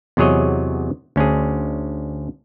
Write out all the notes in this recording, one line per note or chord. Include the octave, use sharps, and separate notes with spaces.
E2 C3 F#3 G#4 C#5 D#5
D2 C#4 D4 G#4